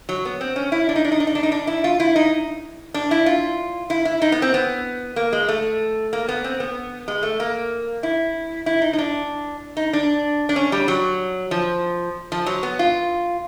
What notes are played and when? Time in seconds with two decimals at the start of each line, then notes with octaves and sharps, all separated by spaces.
0.09 F#3
0.25 B3
0.41 C4
0.56 C#4
0.72 E4
0.89 D4
0.96 D#4
1.05 D4
1.12 D#4
1.20 D4
1.27 D#4
1.35 D4
1.43 D#4
1.52 D4
1.67 E4
1.84 F4
2.00 E4
2.16 D#4
2.94 D4
3.11 E4
3.26 F4
3.90 E4
4.05 E4
4.22 D#4
4.32 B3
4.42 C4
4.54 B3
5.16 A#3
5.32 G#3
5.48 A3
6.13 A#3
6.28 B3
6.44 C4
6.60 B3
7.08 G#3
7.23 A3
7.40 A#3
8.03 E4
8.66 E4
8.82 D#4
8.93 D#4
8.98 D4
9.77 D#4
9.93 D4
10.49 D4
10.56 C#4
10.72 G3
10.88 F#3
11.51 F3
12.32 F3
12.46 F#3
12.63 B3
12.79 F4